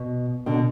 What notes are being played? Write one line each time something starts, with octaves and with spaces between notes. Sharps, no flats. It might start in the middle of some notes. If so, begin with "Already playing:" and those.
Already playing: B2
B2 D3